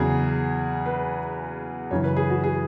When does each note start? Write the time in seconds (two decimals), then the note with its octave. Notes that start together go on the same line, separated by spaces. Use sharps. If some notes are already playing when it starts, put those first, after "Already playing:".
Already playing: E2 C#3 F#3 G#4
0.86 B4
1.91 F#2 C#3 E3 C#5
2.04 B4
2.16 G#4
2.30 F#4
2.44 G#4